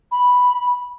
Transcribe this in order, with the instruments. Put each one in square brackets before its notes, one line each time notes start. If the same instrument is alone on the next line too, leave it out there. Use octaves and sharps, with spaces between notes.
[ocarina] B5